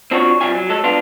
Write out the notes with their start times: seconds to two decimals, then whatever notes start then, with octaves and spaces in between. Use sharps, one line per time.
0.11 C4 D4 F4 F#4 C5 C#5
0.41 B1 E2 C3 G3 F4 G#5
0.55 F#3
0.69 G#3 A4
0.84 B3 D4 F4